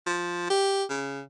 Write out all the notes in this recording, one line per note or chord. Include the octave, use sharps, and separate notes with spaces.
F3
G4
C#3